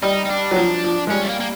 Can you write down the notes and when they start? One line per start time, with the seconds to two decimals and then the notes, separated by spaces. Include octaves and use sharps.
0.02 G3 D#4
0.25 D#4
0.30 D4
0.51 F#3
0.56 F3
0.84 F3
1.07 G#3
1.10 G3 C#4
1.24 A3
1.29 A#3
1.40 A#3